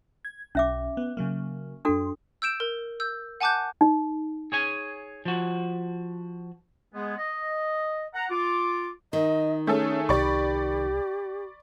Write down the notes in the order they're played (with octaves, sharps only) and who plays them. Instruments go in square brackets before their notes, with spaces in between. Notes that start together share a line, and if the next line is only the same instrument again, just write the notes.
[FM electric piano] G#6
[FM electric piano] B1 [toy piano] C#4 E5 D6
[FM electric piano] B3
C#3 F#3 A#3
[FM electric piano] F#2 C6 [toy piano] D4 F#4 A4
[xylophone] E6 G6 D7 E7
A#4
E6 G6
F#5 G#5 A5 D6 F#6 G6
[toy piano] D#4
[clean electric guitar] G#4 C#5 G#5
F3 F#4
[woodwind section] G#3 B3 G#4
D#5
F#5 A#5
F4 D6
[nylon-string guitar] D#3 [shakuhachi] D#5
[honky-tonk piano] A3 G#4 A4 [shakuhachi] C#4
[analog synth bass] C2 [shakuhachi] G4 [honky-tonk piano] D5 B5 C#6